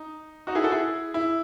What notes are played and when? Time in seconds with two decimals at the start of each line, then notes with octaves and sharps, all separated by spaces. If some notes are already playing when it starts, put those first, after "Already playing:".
Already playing: D#4
0.47 D#4 F#4
0.55 E4 G#4
0.64 F#4 A4
0.72 E4 G#4
1.14 E4